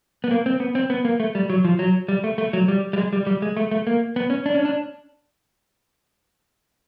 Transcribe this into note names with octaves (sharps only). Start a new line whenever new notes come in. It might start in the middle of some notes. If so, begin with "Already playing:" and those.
B3
A#3
C4
B3
C4
B3
A#3
A3
G3
F#3
F3
F#3
G3
A3
A3
F#3
G3
G3
G#3
G3
G3
G#3
A3
A3
A#3
B3
C#4
D4
C#4
D4